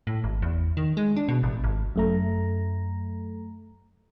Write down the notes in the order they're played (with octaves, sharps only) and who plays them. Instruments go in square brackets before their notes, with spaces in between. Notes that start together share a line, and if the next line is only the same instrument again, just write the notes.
[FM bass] A2
G#1
E2
D#3
G#3
D4
B2
A1
G#1
[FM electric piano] F#2 A3 A#5